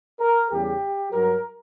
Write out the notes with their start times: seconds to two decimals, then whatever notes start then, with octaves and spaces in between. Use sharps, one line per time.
0.20 A#4
0.51 E2 C#3 G3 G4
1.11 G2 F#3 A#4